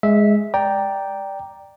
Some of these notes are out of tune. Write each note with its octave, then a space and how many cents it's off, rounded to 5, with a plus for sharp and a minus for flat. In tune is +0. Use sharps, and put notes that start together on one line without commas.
G#3 +0 E5 -15
D5 +0 G5 +0 A#5 +0